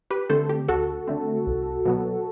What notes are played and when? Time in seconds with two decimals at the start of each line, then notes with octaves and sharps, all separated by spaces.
0.10 G4 B4
0.30 D3 A3 C4 A4 C5
0.49 G4
0.68 D2 F#4 A4
1.08 D3 A3 C4
1.47 C2
1.85 B2 F#3 B3